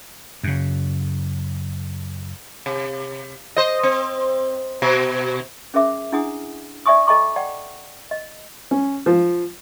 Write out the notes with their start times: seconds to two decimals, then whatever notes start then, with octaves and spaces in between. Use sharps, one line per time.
0.43 F#2 C#3
2.66 C3
3.57 C5 D#5
3.83 C4
4.82 B2
5.74 C#4 G#4 A#4 E5 D6
6.12 D4 E4 G#4 F#5 G#5 D#6
6.86 D5 E5 G#5 C#6 D#6
7.07 A4 D#5 G#5 A#5 C#6 D6
7.36 D5 F#5 G5
8.11 D#5
8.71 C#4
9.06 F3